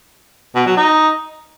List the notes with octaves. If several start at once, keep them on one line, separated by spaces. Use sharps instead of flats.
B2
F#3
D#4